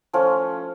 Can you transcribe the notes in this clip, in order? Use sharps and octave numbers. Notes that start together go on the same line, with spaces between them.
F3 A3 C#4